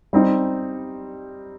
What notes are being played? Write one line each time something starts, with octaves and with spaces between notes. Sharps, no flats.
G3 C4 D#4